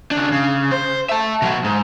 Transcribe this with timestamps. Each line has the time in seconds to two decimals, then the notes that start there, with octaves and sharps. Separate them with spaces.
0.11 C#3 D4
0.32 C#3
0.72 C5
1.09 E5 A5
1.42 B2 F#3
1.64 G#2